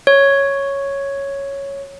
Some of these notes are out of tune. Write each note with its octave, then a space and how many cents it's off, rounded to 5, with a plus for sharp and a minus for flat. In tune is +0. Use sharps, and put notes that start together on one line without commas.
C#5 +0